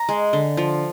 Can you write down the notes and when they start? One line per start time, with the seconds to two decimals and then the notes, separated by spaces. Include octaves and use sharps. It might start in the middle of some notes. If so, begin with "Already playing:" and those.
Already playing: A#5
0.09 G#3
0.33 D3
0.57 F3